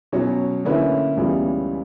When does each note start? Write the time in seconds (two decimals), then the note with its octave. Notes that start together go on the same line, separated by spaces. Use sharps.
0.12 B2 F#3 C#4
0.65 D3 A#3 C#4 E4 B4
1.17 C#2 C#3 E3 G3 B3